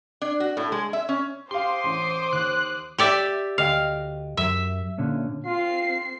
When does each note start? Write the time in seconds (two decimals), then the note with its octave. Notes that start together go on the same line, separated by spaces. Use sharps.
0.22 D4
0.40 F#4
0.57 A2
0.72 G#3
0.93 E5
1.09 C#4
1.51 G4 C5 F5 C6 D6 D#6
1.84 A1
2.33 D#2 F#6
2.98 G4 D5 E5
3.58 D2 D#5 F5 G5
4.37 F#2 E5
4.98 A#2 D3 C#4
5.46 C4 F4 C7